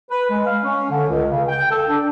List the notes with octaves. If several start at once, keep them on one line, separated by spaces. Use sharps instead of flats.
B4
G#3
F5
C#4
D3
C#2
C#3
G5
A4
D4